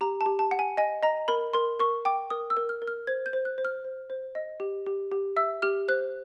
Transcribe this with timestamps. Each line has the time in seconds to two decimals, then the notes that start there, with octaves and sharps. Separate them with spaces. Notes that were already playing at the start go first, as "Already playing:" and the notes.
0.01 G4 A#5
0.21 A5
0.26 G4
0.39 A5
0.51 F#5
0.59 G#5
0.77 D#5 G#5
1.03 D#5 A#5
1.28 A#4 B5
1.53 A#4 C6
1.79 A#4 C#6
2.05 G5 D6
2.30 A#4 D#6
2.50 E6
2.57 A#4
2.69 F6
2.82 A#4
2.87 F6
3.07 C5 G#6
3.26 G6
3.33 C5
3.45 F#6
3.58 C5
3.65 F6
3.84 C5
4.10 C5
4.35 D#5
4.60 G4
4.86 G4
5.12 G4
5.36 E5 E6
5.62 G4 F6
5.88 C5 F#6